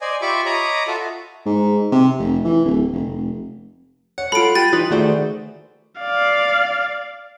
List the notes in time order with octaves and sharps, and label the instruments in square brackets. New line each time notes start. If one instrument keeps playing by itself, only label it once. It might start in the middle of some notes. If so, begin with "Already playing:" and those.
[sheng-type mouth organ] C5 D5 D#5 G#5
F4 G4 E5 B5 C#6 D6
C#5 D#5 A#5 B5 D6 D#6
F4 F#4 A4 E5
[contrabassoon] G#2
C3
F1
E3
D1
F1
F1
[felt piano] C#5 [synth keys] F#5
[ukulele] F4 A4 [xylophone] B5 D7
[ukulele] G4 [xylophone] A6 [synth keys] D#7
[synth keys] E3 F4 [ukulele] D#4 B4
[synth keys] D#3 A3 C5 [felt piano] F#4 G#4 D5
[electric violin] D5 F5